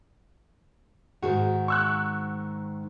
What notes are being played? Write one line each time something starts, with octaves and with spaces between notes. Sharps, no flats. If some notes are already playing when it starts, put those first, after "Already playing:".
G#2 D#3 F#4 G#4
C#6 E6 F#6